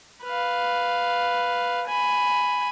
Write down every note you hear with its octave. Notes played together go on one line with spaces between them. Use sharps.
B4 F5
G#5 B5